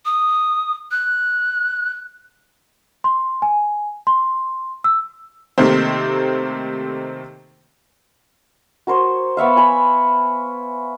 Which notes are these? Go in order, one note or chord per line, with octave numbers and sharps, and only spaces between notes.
D#6
F#6
C6
G#5
C6
E6
C3 D#3 A3 A#3 C4
F#4 A#4 C5 C#5
B3 C#5 E5 F5
C#5 G#5 B5